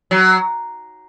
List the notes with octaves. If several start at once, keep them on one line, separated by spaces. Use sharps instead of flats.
F#3